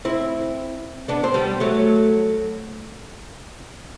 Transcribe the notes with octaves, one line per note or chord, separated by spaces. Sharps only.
C4 E4
B3 D4
C4
G3 B3
F#3 A3